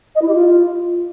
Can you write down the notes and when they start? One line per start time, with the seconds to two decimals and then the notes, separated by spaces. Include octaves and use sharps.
0.15 D#5
0.21 E4
0.28 G4
0.34 F4